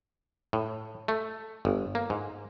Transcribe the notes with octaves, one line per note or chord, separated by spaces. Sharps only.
A2
A3
G1
A#3
G#2